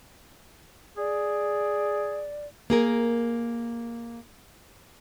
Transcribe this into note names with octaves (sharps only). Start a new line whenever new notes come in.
G#4 D5
A#3 G#4 A#4